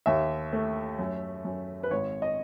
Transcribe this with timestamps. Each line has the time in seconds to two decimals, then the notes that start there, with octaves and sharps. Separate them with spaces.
0.06 D#2 E5
0.53 A3
0.99 F#2
1.45 F#2
1.83 B4
1.91 G#1 C#5
2.22 D#5